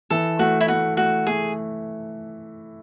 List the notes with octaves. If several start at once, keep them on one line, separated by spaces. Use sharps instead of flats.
E3 A4
A3 F#4
E4
A3 F#4
A3 F#4
A3 G#4